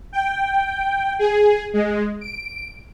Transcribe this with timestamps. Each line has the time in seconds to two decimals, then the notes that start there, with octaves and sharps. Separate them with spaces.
0.13 G5
1.19 G#4
1.73 G#3
2.21 D7